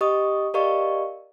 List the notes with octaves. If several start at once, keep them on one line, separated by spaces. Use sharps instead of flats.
G4 D#5 C#6 D#6
G4 A#4 D5 D#5 F5 C#6